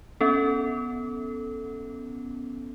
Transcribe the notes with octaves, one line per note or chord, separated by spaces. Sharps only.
B3 C#4 A4